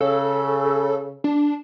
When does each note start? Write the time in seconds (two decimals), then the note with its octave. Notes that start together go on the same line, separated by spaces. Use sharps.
0.01 C#3 A4
1.24 D4